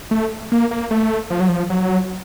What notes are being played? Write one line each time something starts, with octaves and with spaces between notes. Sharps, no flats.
A3
A#3
A#3
A3
F3
F#3
F3
F#3